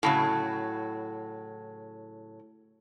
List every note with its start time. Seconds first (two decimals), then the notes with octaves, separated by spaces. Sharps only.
0.03 A2 C#3 F#3